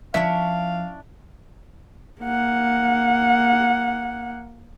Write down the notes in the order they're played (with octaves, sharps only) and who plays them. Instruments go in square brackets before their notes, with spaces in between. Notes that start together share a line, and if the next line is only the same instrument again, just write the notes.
[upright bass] F3 [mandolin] C#4 D4 E4 [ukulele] E5 [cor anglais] F5
[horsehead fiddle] A#3 F#5